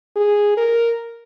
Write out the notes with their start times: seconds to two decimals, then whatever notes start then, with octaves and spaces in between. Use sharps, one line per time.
0.16 G#4
0.57 A#4